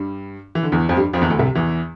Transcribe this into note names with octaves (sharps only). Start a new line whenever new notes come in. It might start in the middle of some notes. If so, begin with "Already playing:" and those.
Already playing: G2 G3
E3
D3
E2 E3
F2 F3
G2 G3
F2 F3
E2 E3
D2 D3
C2 C3
E2 E3